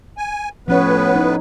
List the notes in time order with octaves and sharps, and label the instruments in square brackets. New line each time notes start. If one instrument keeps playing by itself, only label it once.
[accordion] G#5
[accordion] A2 B3 B4 [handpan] F3 C#4 C#5
[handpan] D#4